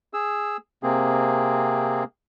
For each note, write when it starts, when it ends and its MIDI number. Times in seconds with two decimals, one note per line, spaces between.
0.13 0.57 68
0.13 0.57 88
0.83 2.04 48
0.83 2.04 58
0.83 2.04 60
0.83 2.04 68